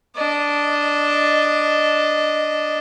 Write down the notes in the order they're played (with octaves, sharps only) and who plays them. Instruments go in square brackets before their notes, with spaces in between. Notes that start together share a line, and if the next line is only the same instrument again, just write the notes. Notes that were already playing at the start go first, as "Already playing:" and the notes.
[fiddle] D4 D#5